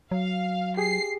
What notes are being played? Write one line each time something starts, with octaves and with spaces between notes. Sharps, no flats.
F#3 F5
G4 G#4 C7